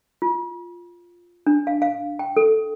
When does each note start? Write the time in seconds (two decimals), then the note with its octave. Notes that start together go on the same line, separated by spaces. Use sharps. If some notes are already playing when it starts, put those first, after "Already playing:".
0.22 F4
1.47 D4
1.67 F5
1.82 F5
2.19 G5
2.37 A4